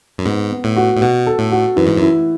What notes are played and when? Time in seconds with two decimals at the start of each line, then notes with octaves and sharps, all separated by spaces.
0.18 F#2
0.26 G#2 B3
0.51 B3
0.64 A2
0.76 F#4
0.95 A2
1.01 B2 F#4
1.27 A4
1.39 A2
1.52 F#4
1.76 F#2 E3
1.87 G#2
1.97 F#2 E4